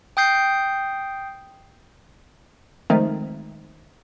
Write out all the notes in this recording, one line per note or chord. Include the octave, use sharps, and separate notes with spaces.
G5 D#6 G6 C7
D#3 F3 G#3 A3 C4 D#4